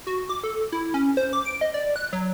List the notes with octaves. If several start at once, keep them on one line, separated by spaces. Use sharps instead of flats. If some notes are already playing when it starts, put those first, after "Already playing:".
F#4
D6
A4
E4
C#4
C5
D6
D7
D#5
D5
F#6
F#3